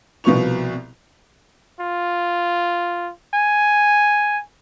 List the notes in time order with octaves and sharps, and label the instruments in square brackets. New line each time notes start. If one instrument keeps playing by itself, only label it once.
[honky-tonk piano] C2 B2 F3 B4 C#6 F7
[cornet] F4
G#5